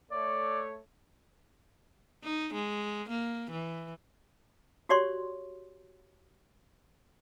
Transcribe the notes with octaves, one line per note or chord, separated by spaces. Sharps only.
A3 C#5 D5
D#4
G#3
A#3
E3
F#4 G4 C#5 D5 C6 C#6